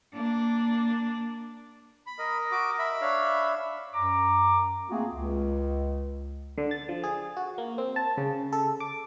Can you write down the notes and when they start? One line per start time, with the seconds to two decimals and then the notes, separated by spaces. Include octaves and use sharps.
0.14 A#3 D4
2.07 B5
2.19 A#4 D#5
2.52 F#4 D6
2.79 E5 B5
3.01 D4 C#5 F5
3.94 F#2 A#5 D6
4.90 A3 A#3 C4 F4 F#4 G#4
5.12 C#2
6.58 D3
6.71 A6
6.89 F3
7.04 G#4
7.37 F#4
7.58 A#3
7.78 C4
7.96 A5
8.17 C#3
8.52 A4
8.80 D6